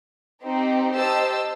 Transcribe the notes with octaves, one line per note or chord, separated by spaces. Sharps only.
C4 D#4 G4
G4 C5 D#5 A5 E6